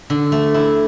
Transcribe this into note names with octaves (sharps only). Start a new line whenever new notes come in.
D3
A3
E4